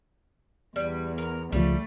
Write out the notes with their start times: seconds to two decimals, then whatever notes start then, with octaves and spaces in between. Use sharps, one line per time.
0.76 E2 G3
1.18 A#4
1.52 C#2 C#3 F3 G3 A3